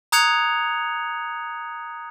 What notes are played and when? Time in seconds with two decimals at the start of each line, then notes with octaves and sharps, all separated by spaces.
0.12 A#5 D#6 F#6 G#6 C#7 F7